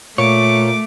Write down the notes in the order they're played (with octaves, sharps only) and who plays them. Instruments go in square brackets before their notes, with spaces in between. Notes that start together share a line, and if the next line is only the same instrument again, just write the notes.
[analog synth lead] A#2 [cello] A3 [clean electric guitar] C#5 [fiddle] D6